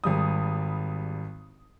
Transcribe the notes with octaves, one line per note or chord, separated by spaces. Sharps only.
G#1 G3 D#6